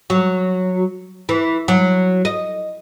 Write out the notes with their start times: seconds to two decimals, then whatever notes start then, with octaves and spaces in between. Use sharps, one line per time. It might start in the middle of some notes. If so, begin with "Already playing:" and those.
0.10 F#3
1.29 E3
1.68 F#3
2.25 D#5